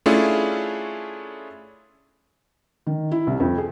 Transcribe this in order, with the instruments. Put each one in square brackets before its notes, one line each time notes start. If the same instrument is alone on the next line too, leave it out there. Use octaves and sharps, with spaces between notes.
[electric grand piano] A3 C#4 D4 E4 F4 G#4
[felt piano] D#3
E4
C2
F2
G#4